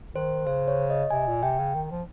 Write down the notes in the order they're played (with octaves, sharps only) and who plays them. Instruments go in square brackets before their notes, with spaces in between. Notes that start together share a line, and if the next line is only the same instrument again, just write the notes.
[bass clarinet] D#3 [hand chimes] C5
[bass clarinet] C#3 [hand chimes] C5
[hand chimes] C#5
D#5
[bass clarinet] C3 [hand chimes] G#5
[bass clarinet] A#2
[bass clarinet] C3 [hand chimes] G5
[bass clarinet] C#3
D#3
F3